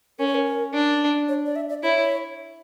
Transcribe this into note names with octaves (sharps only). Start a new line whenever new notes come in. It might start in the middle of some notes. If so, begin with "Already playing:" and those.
C#4 A#4
C#5
A#4
D4
C#5
D5
E5
D5
E4 C#5